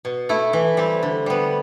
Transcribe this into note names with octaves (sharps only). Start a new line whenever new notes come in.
B2
A3 E4
E3
G3 C4
D3
G3 B3